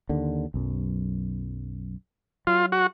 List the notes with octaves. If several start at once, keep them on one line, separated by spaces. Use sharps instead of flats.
D#2 D3
B1 F#2
F#3 F4
F#4